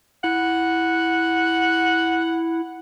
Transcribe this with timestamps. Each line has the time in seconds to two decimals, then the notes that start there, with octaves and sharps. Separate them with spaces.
0.24 E4 F#5